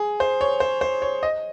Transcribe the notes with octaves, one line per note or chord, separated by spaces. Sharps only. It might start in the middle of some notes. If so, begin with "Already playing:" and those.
Already playing: G#4
C5
C#5
C5
C5
C#5
D#5